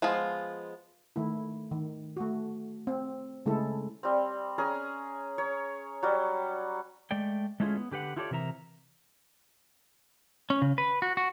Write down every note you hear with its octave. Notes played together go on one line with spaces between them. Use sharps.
F3 G#3 B3 F4
D#3 A3 E4
D#3
A3 F#4
C4
C#3 G#3 A3 E4 A4
G3 C4
C#4 G#4 G#5 A#5
C#5 A#5
F#3 G3
G#3 A3 D5 G5
G#3 A3 C#4 E4 F4 G#4
B3
D3 G4 B4 F#5
E4 F4 G4 A4 C#5 D5
C3 E3 A#4 E5 A#5
C#4
C#3
B4
F#4
F#4